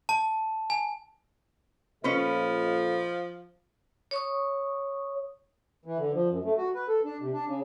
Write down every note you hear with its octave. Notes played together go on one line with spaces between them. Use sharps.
A5
G#5
A#2 F3 C#4 A4 B4 D#5
C#5 C#6 D#6
E3
D3
F3
F#2
A3
F#4
B4
A4
D4
C3
D4
C#3